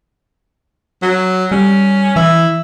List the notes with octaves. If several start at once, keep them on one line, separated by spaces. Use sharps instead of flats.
F#3
G3 C#4
E3 E4